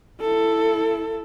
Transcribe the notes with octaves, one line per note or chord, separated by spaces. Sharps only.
E4 A4